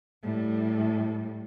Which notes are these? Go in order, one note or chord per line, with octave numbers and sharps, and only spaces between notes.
A2 G3